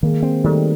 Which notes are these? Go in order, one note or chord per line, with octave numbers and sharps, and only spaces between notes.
D#3 G#3 A#3
C4
D#3 G3 A3